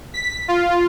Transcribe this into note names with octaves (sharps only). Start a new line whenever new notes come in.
B6
F4